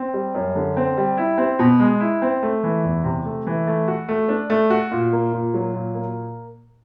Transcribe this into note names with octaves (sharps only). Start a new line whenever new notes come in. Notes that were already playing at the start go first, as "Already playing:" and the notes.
Already playing: C4
G3
F#2
D3
C4
G3
E4
C4
B2
G#3
E4
C4
A3
E3
E2
C3
A3
E3
A3
F#4
A3
D4
A3
F#4
A#2
A#3
A#2
F#3
A#2
A#3